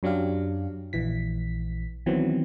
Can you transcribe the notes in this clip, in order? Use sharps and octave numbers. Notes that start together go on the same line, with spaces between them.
F#2 F#3 D4 G4 F5
A#1 E3 B6
D#3 E3 F#3 B3 C4